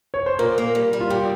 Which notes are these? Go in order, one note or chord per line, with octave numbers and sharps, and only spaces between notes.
C#5
C5
A#2 A#4
A#3
G3
G3
F4
A#2 G4